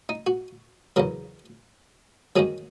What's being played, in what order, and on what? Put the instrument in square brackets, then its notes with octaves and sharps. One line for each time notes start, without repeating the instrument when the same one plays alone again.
[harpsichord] D#4
F#4
E2 C#3 F#3 A#4
F#2 D#3 F#3 G#4